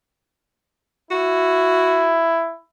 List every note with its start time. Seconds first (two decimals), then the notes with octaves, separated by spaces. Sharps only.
1.11 E4 F#4